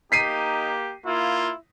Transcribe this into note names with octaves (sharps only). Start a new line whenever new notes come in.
A#3 D#4 G4 B6 C7 D#7
A#3 E4 F4